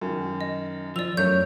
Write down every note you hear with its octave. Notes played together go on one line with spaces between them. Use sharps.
F#2 D#3
D#5
F3 D5 E6 F7
F#2 A3 A#4 C#5 G6